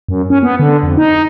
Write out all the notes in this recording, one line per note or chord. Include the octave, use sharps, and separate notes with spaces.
F#2
C#4
B3
D3
F2
D#4